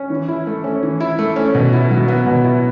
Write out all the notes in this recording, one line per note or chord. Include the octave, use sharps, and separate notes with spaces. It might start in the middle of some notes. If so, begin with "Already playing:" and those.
Already playing: C#4
E3
E4
A3
C#4
E3
E4
A3
C#4
B2
E4
F#3
B3
B2
E4